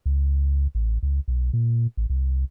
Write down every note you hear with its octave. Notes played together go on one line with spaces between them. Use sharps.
C#2
A1
C#2
B1
A#2
A1
C2